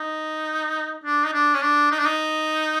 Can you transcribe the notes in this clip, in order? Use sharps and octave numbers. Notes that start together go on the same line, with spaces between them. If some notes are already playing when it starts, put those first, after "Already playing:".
Already playing: D#4
D4
D#4
D4
C#4
D4
D#4
D4
D#4